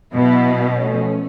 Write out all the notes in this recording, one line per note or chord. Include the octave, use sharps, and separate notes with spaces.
B2 F#3 B3 E4
F3 A3 C#4